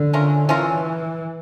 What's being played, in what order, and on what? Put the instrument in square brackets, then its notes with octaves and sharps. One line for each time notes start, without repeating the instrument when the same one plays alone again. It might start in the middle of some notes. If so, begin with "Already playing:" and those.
Already playing: [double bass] D3
[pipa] A3 C#4 F4 A#4
[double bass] E3 [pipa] A3 C#4 F4 A#4